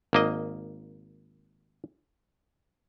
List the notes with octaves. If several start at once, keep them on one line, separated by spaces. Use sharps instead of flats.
G#1 A#3 D#5